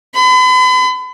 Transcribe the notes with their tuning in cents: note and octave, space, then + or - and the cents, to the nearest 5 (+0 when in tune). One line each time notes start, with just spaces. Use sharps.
B5 +40